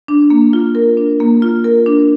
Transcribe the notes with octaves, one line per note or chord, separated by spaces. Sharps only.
D4
A#3
F4
A#4
D4
A#3
F4
A#4
D4